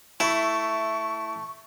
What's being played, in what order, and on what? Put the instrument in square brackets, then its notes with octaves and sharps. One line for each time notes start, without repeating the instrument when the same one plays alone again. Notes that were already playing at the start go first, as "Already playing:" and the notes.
[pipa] A3 [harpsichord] E4 [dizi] C#6